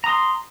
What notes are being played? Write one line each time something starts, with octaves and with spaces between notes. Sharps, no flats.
A#5 C6 D#6